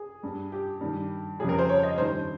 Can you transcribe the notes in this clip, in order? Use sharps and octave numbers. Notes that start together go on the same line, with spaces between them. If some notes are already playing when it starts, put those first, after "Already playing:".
Already playing: G#4
G2 G3
G4
G2 D#3 G3
F2 C#3 G3 G#4
A#4
C5
C#5
D#5
G2 D#3 G3 C5